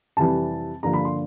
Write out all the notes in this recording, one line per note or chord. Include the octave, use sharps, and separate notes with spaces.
F2 C3 E3 G3 A5
G2 D3 F3 A#3 A#5
B5
C6